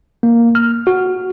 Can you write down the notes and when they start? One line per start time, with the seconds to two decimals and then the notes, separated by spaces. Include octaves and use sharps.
0.23 A#3
0.55 F6
0.87 F#4